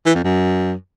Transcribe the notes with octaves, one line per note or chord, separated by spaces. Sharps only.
E3
F2
F#2